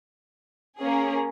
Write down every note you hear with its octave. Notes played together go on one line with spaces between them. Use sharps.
A#3 C#4 G#4